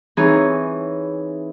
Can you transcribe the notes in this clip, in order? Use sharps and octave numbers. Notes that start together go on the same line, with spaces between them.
E3 C4 D#4 G#4 C#5